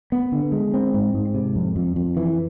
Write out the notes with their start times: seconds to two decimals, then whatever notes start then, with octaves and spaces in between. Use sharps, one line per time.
0.12 B3
0.32 D3
0.52 G#3
0.74 C4
0.94 G#2
1.14 G#2
1.35 C3
1.56 F2
1.76 F2
1.96 F2
2.17 E3